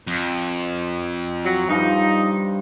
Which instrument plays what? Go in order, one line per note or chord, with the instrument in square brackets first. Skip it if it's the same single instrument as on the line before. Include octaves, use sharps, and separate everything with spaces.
[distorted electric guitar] F2
[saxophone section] F#3
[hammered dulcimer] G2 F3 [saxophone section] D#4